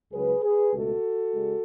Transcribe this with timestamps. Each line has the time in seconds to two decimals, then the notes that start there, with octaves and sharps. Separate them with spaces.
0.13 C#2 C#3 F#3 G#4 B4
0.43 G#4 B4
0.73 C#2 B2 A3 F#4 A4
1.33 C#3 G#3